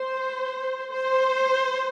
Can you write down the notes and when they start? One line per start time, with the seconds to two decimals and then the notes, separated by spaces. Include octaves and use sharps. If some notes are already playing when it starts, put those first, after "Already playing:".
Already playing: C5
0.92 C5